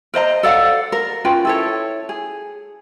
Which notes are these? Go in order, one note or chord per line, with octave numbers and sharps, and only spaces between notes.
A#4 C5 D#5 A#5
A4 D5 F5 F#5
A#4
C#4 F4 B4 G5
E4 A4 C#5
G#4